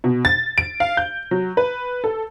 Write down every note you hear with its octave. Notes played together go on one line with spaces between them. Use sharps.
B2
A6
D7
F5
G6
F#3
B4
A4